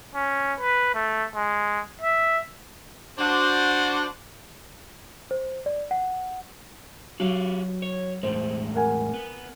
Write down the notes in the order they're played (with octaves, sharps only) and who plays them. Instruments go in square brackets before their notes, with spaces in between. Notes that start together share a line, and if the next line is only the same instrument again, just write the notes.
[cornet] C#4
B4
A3
G#3
E5
[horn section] D4 F#4 C5
[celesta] C5
D5
F#5
[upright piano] F#3 [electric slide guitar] F#4 G4 F5
[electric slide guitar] C#5
[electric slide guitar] E2 A2 G#3 [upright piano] C5
[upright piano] A#4 F#5 G#5
[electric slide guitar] B3